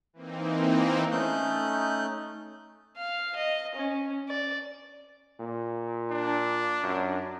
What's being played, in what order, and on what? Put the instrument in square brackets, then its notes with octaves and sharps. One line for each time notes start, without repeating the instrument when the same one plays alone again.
[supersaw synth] E3 A#3 C4 D#4
[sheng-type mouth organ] A3 C#4 D#4 F#6 G6
[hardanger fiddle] F5
D#5
C#4
D5
[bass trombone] A#2
[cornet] D4
[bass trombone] F#2